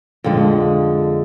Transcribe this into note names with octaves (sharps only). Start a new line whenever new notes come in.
F2 D3 G#3